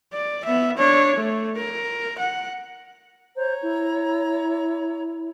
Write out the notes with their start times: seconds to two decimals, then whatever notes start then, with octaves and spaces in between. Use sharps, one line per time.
0.13 D5
0.45 B3 E5
0.78 D4 C#5
1.16 A3
1.57 A#4
2.19 F#5
3.35 C5 C#5 A#5
3.62 E4